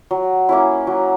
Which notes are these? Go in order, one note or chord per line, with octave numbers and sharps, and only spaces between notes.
F#3
A#3 C#4 E4
F#3